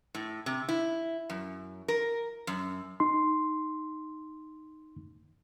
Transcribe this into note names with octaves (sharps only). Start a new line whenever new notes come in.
A2
C3
E4
F#2
A#4
F#2
D#4 C6